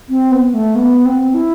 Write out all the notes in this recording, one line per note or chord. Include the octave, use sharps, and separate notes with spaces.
C4
B3
A3
B3
C4
E4